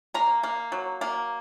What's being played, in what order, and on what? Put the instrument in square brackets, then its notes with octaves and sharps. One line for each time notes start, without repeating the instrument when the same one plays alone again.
[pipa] A#3 A#5
A#3
F#3
A#3